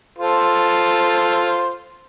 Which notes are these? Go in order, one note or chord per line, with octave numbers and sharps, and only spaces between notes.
F4 A4 C5